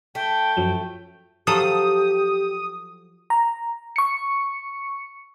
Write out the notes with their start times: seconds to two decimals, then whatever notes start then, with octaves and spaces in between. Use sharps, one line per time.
0.15 A3 G5
0.57 F#2 F3 F#3
1.47 F3 F#3 G4 A4 D#6
3.30 A#5
3.96 C#6 C#7